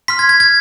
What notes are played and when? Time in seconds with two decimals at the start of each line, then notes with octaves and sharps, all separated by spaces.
0.08 C6 F6 B6
0.19 G#6
0.29 G#6
0.40 G#6